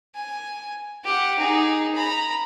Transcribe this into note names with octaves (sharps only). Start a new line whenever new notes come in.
G#5
G4 F#5
D#4 G#4
A#5 B5